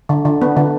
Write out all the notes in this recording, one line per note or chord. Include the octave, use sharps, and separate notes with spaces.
D3
D3
B3
D3